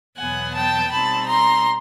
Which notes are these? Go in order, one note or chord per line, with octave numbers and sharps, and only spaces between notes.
E2 B2 F#3 B3 F#5 G#5
G5 A5
B2 G3 C4 D#4 A5 B5
A#5 C6